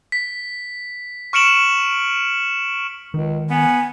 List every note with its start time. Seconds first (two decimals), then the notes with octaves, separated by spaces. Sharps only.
0.12 B6
1.33 C#6 F6 C#7 D7 E7 F#7
3.14 C#2 D#3
3.50 B3 G#5